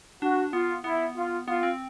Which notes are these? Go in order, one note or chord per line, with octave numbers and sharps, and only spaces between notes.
D4 F#4
B3 F4
B3 E4
F4
B3 F4
C4